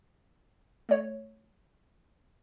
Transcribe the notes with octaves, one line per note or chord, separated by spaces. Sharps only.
A3 C#5